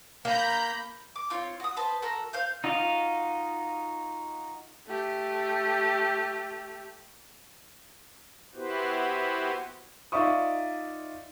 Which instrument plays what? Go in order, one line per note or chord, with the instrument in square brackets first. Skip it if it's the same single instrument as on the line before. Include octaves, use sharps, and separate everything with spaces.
[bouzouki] A#3 [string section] A#5 B5 G6
[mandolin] D6
C4 F4 C#5
F#4 D#6
B4 C5 A5
F#4 A4 A#4 A#5
C5 F5 G6
[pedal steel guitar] D#4 F4 F#4 D#5 F5
[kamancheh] A3 G4
[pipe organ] B3 E4 F#4 G4 B4 C5
[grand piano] D#4 F4 D5 E5 C#6 D#6